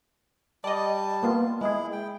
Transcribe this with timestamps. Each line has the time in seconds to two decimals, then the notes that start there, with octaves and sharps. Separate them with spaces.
0.64 G3 D5 D#5 A5
1.23 A#3 B3 F4
1.61 G#3 E4 G#4
1.92 G5